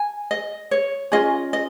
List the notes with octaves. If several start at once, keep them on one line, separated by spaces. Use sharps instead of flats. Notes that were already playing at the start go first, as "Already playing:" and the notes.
Already playing: G#5
D#5
C#5
C#4 F4 G#4 D#5
D#5